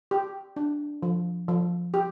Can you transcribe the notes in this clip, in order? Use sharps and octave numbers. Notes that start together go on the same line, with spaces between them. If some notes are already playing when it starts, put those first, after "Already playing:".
G4
D4
F3
F3
G4